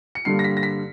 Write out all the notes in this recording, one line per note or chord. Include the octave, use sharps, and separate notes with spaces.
C#7
G2 D3 G3 A#3 C7
A#6
B6
A#6
B6